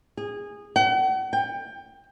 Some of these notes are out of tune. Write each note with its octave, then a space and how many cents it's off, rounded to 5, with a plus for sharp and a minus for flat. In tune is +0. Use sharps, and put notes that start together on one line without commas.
G#4 -20
F#5 +45
G5 +20